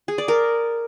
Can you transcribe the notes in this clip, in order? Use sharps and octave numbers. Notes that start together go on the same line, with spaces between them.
G#4
D5
A#4